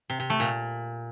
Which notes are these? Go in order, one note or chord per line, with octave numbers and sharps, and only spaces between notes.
C3
C3
A3
A#2